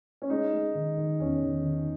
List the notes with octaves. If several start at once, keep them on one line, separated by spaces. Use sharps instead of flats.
C#4
G#3 D#4
G#3
D#3
D#3
E2 C#4
D#3
D#3